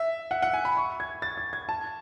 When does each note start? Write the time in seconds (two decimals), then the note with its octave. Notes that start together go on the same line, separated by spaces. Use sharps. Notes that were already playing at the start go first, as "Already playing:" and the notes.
Already playing: E5
0.31 F#5
0.42 F#5
0.54 G#5
0.65 B5
0.77 C#6
1.00 G#6
1.22 A6
1.38 G#6
1.53 G#6
1.69 A5